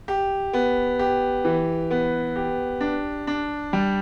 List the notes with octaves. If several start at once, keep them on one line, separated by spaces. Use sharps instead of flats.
G4
B3
G4
E3
B3
G4
D4
D4
G3